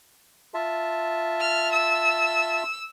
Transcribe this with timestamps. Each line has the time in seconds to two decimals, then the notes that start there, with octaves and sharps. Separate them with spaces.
0.54 F4 E5 A5
1.41 F6
1.72 E6